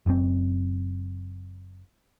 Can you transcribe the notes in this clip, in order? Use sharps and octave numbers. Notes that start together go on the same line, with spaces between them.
F#1 F#2 C3 C4